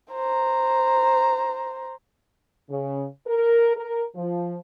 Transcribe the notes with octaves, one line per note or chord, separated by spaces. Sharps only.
C5 A#5
C#3
A#4
A#4
F3